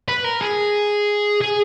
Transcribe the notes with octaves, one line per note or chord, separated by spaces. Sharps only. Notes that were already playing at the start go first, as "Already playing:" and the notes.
B4
A#4
G#4
G#4